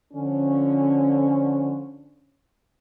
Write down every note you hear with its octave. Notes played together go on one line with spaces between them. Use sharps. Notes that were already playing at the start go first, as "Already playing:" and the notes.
D3 F3 C#4